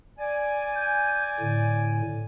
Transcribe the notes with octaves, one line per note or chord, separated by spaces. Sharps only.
D5 G#5
G6
A2 D3